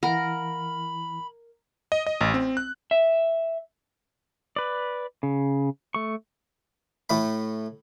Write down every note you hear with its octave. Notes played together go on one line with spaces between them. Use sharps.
E3 E4 A#4 F5 F#5 B5
D#5
D#5
A1
C4
F#6
E5
B4 D5
C#3
A3 C#6
A2 A3 B5